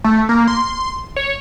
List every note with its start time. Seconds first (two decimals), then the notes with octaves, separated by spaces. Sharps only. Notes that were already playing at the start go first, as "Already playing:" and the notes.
0.04 A3
0.29 A#3
0.48 C6
1.16 C#5